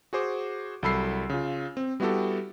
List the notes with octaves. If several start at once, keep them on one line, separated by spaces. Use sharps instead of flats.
F#4 G#4 C5 D6
C2 F#3 A4 B5 E6 C7
C#3 F4
C4
G3 B3 E4 F#4 G4 A4